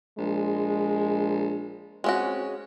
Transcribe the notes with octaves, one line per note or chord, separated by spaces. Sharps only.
A#1 G#3
G#3 C4 C#4 F#4